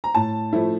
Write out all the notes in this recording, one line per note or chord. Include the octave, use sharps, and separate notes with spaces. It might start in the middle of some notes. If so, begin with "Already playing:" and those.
A#5
A2 A5
F3 A3 E4